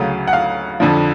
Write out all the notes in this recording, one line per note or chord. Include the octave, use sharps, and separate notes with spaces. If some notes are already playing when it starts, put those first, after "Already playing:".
Already playing: D2 C#3 F#3 F5
F#5
F5
F2 D3 F3